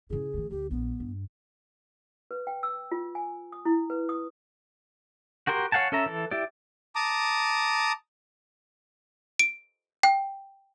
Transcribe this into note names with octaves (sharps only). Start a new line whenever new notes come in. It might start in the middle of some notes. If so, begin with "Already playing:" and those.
C#3 E4 G#4
D#3 A3
D2 G4
A#1 B3
G2
B4
G5
E6
F4
G#5
D#6
E4
B4
D#6
F#4 G4 A#4 C6
C#5 F5 F#5 G#5 A5
C#4 A4 E5 A#5
E3 A4
E4 G4 D5
A5 A#5 D6 D#6
D7
G5